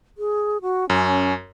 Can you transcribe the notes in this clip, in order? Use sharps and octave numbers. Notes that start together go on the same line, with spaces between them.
G#4
F#4
F#2 C#4